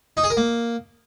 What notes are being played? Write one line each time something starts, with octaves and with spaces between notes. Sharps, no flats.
D#4
G#4
A#4
A#3